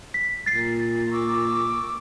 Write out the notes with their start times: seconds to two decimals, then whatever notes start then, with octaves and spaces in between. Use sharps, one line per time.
0.14 B6
0.46 A#2 A6 C7
1.11 C#6 D6 E6